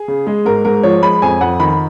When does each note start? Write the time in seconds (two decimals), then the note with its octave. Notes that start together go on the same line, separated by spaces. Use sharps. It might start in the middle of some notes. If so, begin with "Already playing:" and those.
Already playing: G#4
0.08 C#3
0.27 G#3
0.45 G#2 A#4
0.65 G#2 A#4
0.83 F3 C#5
1.03 G#3 B5
1.22 F2 G#5
1.41 F2 F#5
1.60 D#3 B5